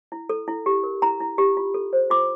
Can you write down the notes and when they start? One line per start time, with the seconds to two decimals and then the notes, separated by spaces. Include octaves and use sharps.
0.12 E4
0.29 A4
0.48 E4
0.66 G4
0.83 A#4
1.02 E4 A#5
1.20 E4
1.38 G4
1.57 F4
1.74 A4
1.93 C5
2.10 F4 D6